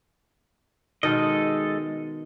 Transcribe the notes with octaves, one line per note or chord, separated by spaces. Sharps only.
B2 D#3 G#3 A4 D#5